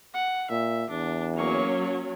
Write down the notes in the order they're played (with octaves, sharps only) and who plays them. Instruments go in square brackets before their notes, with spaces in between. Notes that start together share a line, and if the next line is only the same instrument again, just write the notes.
[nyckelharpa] F#5
[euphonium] A#2 [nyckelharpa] E5
[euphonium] E2 [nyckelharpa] D4
[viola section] F#3 C#4 C#5 [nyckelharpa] A#3 C#6